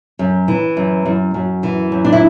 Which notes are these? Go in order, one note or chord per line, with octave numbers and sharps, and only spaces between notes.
F#2
E3
F#2
F#2
F#2
E3
F#2
D4
E4